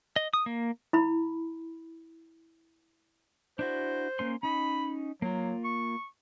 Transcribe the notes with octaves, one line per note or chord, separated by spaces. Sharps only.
D#5
D#6
A#3
E4 B5
D4 E4 F#4 C5
A#3 C#4 C6
C#4 D#4 B5
F#3 A#3 F4
C#6